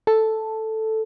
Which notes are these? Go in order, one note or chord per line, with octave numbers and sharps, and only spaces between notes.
A4